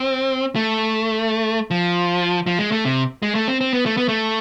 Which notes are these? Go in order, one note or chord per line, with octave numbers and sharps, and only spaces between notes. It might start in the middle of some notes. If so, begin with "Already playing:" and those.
Already playing: C4
A3
F3
F3
G#3
A3
C3
G#3
A3
C4
C4
B3
A3
B3
A3